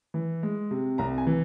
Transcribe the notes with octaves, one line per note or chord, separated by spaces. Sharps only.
E3
G#3
C3
C2 A#5
G#5
E3